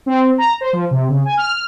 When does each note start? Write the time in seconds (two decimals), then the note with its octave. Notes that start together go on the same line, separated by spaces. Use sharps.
0.06 C4
0.38 A#5
0.61 C5
0.73 F3
0.91 C3
1.09 C#3
1.25 G#5
1.37 F6